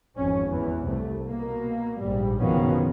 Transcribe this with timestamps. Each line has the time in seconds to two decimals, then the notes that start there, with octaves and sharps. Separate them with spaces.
0.16 G#1 F2 C#4
0.47 E2 E3
0.85 C2 A3
1.26 B2 A#3
1.99 A#1 G#2 G3
2.39 F#1 B2 D#3 F3 B3 C#4